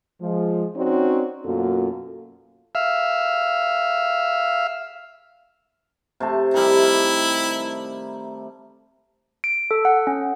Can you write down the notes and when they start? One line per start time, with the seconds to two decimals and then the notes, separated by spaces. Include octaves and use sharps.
0.21 F3 G#3
0.76 C4 C#4 D#4 F#4 C#5 D5
1.45 F#2 B2 A#3 F4 F#4 A4
2.75 E5 F5
6.20 C3 A3 A5
6.54 D#3 G3 E4
9.44 D7
9.71 A4
9.85 F#5
10.07 C#4